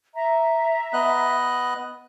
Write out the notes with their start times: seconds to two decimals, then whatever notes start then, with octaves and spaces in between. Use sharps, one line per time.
0.15 E5 A#5
0.93 B3 D#5 F#6